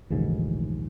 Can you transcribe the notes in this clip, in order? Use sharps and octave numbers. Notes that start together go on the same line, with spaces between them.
A#1 D#2 G#2 C#3 E3 A3